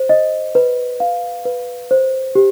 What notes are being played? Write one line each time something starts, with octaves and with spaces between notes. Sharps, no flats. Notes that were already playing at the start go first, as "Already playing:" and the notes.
Already playing: C5
D#5
B4
F5
B4
C5
G4